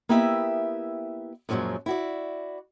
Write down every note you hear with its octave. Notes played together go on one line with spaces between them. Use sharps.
A#3 B3 E4 G4 D#5 E5
F#2 A#2 F3 F#3 G#3
E4 F#4 D5